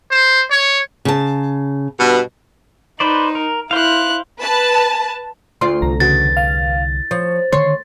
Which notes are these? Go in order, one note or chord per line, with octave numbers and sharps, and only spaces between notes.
C5
C#5
C#3 A5
G2 B2
D#4 B4 C5 D5
A#4
E4 C5 F5 F#6
B4 A5
D2 F4 D5 C6
C2 D3 A#5
E2 C#3 F#4 A6
F5
F3 C#5
D3 D#3 C#5 C6